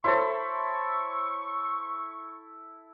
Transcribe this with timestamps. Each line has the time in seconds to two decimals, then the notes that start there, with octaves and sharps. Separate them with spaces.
0.04 E4 A4 C5 C#5 C6 C#6